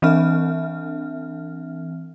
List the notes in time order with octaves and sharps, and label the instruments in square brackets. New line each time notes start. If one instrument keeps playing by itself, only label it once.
[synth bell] E3 C4 D4 E5 F6